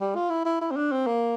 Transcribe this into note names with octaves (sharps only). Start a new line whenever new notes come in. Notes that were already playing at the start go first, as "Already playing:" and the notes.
G3
F4
E4
E4
E4
C4
D4
C4
A#3